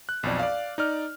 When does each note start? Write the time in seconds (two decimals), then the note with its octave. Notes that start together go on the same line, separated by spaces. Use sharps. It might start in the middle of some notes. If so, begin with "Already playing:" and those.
0.09 F#6
0.23 B1 F2 D5
0.39 D5 F5
0.78 D#4 D5 F6